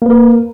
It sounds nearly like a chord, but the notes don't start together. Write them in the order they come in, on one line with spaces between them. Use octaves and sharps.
A#3 B4 A#4